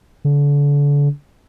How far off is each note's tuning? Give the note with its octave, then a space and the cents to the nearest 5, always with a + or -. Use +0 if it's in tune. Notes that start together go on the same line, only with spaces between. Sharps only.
D3 -35